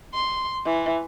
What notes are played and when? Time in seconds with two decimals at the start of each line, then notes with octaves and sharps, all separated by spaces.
0.14 C6
0.65 E3